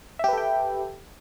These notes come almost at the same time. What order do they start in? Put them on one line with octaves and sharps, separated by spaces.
E5 G4 B4 A4 G5